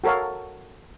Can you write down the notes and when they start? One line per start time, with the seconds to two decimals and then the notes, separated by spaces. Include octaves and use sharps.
0.04 F#4 A4 A#4 C#5 F5